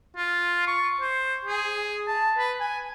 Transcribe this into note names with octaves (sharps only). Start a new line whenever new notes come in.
F4
C#6
C5
G#4
A5
B4
G#5